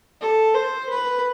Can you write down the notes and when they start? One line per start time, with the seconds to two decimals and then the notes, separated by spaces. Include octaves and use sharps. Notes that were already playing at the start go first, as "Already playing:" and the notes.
0.21 A4
0.55 C5
0.90 B4